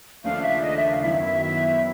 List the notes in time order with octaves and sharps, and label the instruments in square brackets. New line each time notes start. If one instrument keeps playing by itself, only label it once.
[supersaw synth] D#2 C#3 F3 A3 D4 [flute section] F5
[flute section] E5
D#5
E5
F5
[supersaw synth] F#2 D#3 F#3 B3 E4 [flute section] E5
[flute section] E5
E5